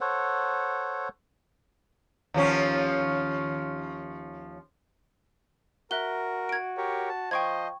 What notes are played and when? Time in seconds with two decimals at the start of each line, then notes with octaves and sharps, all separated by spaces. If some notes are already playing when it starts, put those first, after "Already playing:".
0.01 A4 C5 C#5 F#5
2.34 D#2 F3 C#4
5.91 F#4 A#4 E5 F#6 G7
6.49 G#6 D7
6.77 G4 A#4 C#5
7.09 A5
7.31 F3 C5 D#5 G5 C#6 G#6